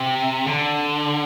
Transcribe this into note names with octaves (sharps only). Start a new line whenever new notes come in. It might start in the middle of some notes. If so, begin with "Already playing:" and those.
Already playing: C3
D3